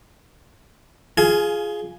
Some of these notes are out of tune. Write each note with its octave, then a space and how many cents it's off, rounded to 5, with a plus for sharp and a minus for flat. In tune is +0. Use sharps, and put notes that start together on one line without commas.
F4 +0 G#4 +5 G#5 +30